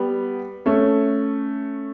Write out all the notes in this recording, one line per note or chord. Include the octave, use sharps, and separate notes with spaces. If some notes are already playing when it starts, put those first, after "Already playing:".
Already playing: G3 B3
A3 C#4